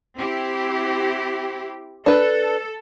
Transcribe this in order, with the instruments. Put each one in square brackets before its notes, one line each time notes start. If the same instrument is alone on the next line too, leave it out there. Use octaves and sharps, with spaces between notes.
[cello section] C4 E4 G4
[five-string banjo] D4 B4 [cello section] A4